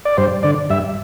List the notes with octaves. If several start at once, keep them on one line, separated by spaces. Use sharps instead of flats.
D5
G2 C5
D3 D5
G2 E5